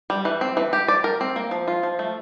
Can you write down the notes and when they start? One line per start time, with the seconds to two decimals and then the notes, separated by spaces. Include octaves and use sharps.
0.10 G3
0.25 E3
0.41 C4
0.57 E3
0.73 G4
0.88 D5
1.04 A#4
1.21 C4
1.36 A#3
1.51 F3
1.68 F4
1.83 F3
1.99 A3